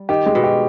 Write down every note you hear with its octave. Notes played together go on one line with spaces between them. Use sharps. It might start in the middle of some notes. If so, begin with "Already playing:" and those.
Already playing: G3
D#3 G4
G#3
B2
G4